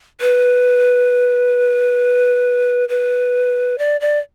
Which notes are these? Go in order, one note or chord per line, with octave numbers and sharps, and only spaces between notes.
B4
B4
D5
D5